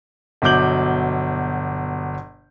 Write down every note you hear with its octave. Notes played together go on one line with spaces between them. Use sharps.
G1 B2 F#3 D6 G6 F#7